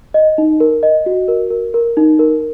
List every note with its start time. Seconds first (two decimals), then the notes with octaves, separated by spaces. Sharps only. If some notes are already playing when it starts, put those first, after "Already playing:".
0.14 D#5
0.38 D#4
0.60 A#4
0.83 D#5
1.06 F#4
1.28 A#4
1.51 A#4
1.74 A#4
1.97 D#4
2.19 A#4